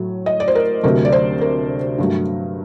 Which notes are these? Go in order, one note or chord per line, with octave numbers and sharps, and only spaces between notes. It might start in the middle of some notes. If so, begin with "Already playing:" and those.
Already playing: A2 F#3 A3
D#5
D5
C5
A#4
D2 C3 F#3 A3 A#4
D5
C5
A#4
G2 F#3 A3